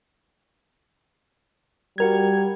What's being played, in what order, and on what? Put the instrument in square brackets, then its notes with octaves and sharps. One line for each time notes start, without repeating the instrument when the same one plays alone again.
[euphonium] G3 [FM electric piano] F#4 A#4 G#6